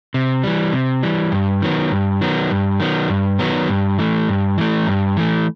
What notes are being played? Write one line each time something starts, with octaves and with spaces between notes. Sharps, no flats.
C3
E3 G3
C3
E3 G3
G2
D#3 F#3 B3
G2
D#3 F#3 B3
G2
D#3 F#3 B3
G2
D#3 F#3 B3
G2
E3 A3
G2
E3 A3
G2
E3 A3